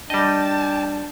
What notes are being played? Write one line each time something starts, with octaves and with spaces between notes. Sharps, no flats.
G3 D4 D#5 G5 A5